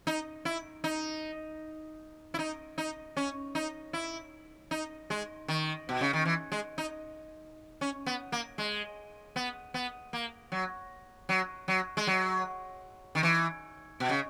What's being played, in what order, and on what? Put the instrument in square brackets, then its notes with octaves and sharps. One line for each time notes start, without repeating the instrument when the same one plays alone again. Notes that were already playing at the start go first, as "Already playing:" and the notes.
[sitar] D#4
E4
D#4
E4
D#4
D#4
C#4
D#4
E4
D#4
G#3
D#3
B2
C#3
D#3
E3
G#3
D#4
C#4
B3
A#3
G#3
B3
B3
A#3
F#3
F#3
F#3
G#3
F#3
D#3
E3
B2
C#3